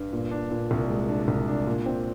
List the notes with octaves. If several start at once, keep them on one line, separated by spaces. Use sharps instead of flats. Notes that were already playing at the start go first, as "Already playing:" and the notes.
Already playing: G2
A#2
D4
A#2
C2
G#3
D4
C2
D4
A#2
C4